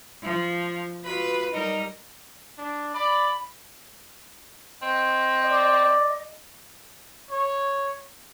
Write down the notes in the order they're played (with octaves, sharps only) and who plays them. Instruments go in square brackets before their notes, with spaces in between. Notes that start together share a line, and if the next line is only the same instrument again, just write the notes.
[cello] F3
[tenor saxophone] B2 [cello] F4 B4
[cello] G3 A#4 [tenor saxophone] D#4
[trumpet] D4
[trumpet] D5 [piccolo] B5
[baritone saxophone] C4 [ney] D#5
[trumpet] D5
[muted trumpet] C#5